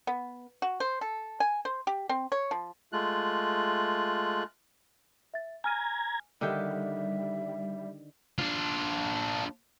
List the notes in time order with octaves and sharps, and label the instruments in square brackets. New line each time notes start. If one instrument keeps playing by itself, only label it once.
[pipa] B3
F#4
C5
A4
G#5
C5
G4
C4
C#5
F3
[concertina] G#3 A3 F4 F#6
[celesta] E5 A6
[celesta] G#5 F6 D#7 [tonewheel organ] A#5 G#6
[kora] D3 D#3 G4 [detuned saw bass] G3 [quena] E5
[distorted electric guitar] D4 F4